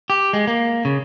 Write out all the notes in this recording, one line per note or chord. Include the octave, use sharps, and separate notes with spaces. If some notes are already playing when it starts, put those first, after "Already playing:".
G4
G#3
A#3
C#3